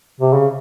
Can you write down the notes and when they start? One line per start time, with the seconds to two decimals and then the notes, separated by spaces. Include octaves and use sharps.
0.20 C3
0.33 C#3